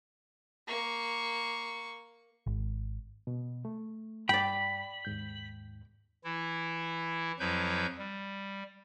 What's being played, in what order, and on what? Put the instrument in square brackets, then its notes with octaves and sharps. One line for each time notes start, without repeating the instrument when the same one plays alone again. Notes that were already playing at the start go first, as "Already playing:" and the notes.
[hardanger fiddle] A#3 C#6
[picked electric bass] G#1
[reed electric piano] B2
A3
[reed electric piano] G2 [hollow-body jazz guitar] D5 G5 [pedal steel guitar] B5
[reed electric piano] D#2 G#2 G6
[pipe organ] E3 E4
F2 F3 F#3 E4 B4 G6
G3